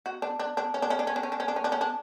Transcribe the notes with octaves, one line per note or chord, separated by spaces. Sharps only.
F#4
D4
D4
D4
C#4
D4
C#4
D4
C#4
D4
C#4
D4
C#4
D4
C#4
D4
C#4
D4